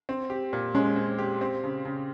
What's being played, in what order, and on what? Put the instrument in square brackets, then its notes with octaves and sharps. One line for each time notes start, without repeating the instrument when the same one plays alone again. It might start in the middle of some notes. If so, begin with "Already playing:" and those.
[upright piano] C4
G4
A#2
[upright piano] G#3 [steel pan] C#4
[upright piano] C4
G4
C4
C#3
C#3